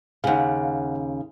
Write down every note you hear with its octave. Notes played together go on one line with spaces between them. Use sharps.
D#2 C#3 F5 F#5